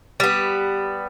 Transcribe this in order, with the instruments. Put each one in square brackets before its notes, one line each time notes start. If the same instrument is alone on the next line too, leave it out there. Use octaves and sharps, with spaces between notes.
[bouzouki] G3 B3